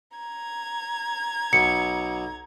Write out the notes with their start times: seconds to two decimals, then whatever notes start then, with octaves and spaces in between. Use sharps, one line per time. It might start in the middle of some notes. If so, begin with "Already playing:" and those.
0.17 A#5 G#6
1.53 B1 C#7